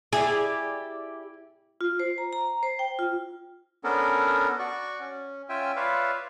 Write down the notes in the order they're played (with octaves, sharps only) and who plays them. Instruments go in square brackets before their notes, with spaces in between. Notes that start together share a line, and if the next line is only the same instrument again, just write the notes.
[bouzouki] E4 G4 D5 [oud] G#4
[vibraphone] F4
C5
A#5
A#5
C5
G5
F4
[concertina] B3 C#4 D4 A4 A#4
F#4 D5 C#6
C#4
C#4 F4 E5 G5 G#5
F4 B4 C#5 D5 E5 F5